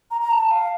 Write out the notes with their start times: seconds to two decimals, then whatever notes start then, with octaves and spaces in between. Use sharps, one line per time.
0.11 A#5
0.21 A#5
0.31 A5
0.51 F5